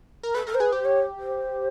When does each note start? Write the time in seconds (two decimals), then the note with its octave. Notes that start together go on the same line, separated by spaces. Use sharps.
0.23 A#4
0.34 A4 B4
0.47 A4 A#4
0.54 C5
0.60 G#4 B4
0.72 G4 C5
0.84 C#5
1.19 C5